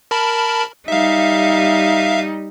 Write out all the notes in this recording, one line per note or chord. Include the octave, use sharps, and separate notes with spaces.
A#4 A5 B5
G3 D#4 E5 F5